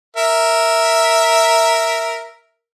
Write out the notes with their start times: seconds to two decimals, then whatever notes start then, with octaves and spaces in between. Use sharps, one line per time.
0.17 A#4 E5